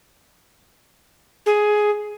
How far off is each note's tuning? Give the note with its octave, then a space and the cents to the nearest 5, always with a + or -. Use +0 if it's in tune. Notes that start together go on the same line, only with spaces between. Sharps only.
G#4 +10